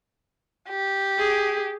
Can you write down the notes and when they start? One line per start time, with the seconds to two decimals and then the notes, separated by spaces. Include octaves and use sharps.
0.69 G4
1.18 G#4